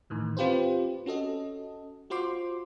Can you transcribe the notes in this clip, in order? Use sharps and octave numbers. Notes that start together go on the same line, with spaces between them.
A2 D#3 E3
C4 F4 G4 B4 C5
C#4 F#4 A4 D#5
F4 F#4 C5 C6 D6